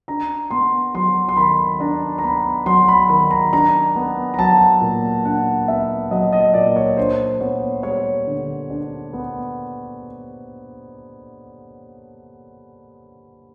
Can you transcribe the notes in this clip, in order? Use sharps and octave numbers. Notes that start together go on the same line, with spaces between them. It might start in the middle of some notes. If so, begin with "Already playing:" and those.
D4 A#5
B3 C6
F#3 C6
C6
D#3 B5
D4 A#5
A#5
B3 B5
F#3 C6
B5
D#3 B5
A#5
D4 A#5
B3
A#5
F#3 A5
A#2
D4 F#5
B3 E5
F#3 D#5
D#5
A#2 D5
C#5
D4 C5
B3 C#5
G3 C#5
D3
D4
B3